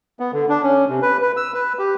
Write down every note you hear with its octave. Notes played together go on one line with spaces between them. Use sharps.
B3
D3
D4
C#4
C3
B4
B4
E6
B4
G4